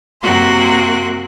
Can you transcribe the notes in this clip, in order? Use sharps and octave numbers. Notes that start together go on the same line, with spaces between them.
F#2 C3 A#3 F#4 C6 F#6